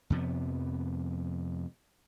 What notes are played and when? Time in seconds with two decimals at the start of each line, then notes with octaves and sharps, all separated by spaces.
0.10 F2 C3 F3 B3